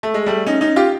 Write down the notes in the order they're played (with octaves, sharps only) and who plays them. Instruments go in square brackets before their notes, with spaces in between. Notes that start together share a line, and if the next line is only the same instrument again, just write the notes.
[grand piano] A3
G#3
G3 A3
C#4 D#4
C#4 D#4
F4 G4